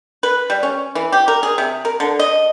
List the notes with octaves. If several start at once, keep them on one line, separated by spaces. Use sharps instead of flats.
B4
G3
C#4
E3
G4
A#4
G#4
C3
A#4
D3
D#5